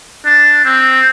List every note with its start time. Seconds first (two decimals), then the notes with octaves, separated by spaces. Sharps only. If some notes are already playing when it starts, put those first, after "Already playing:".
0.25 D4
0.65 C4